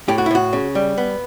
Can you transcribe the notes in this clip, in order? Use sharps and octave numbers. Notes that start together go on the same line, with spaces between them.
A2 G4
F#4
E4
A2 F#4
C#3
G3
B3